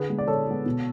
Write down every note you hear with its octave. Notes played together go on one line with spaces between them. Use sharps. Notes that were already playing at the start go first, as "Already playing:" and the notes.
Already playing: D3 G#4 B4
G#3 B3
D5
D3 A4 C#5
G#3 B3
B2